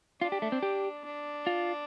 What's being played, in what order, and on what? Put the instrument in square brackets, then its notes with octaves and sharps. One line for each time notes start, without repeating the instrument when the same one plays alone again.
[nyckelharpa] D4 [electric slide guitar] F4
[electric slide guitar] G4
A3
C4
G4
[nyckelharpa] D4
[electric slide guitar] F4